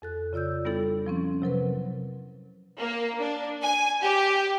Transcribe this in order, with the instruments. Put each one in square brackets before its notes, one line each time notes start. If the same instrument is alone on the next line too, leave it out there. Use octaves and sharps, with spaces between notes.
[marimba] F2 A4 F#6
C#3 F4 D5 E6 G6
G3 B3 D4 E4 A4
F3 C4 C#4
C3 F#3 A#4 B4
[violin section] A#3
D4
G#5
G4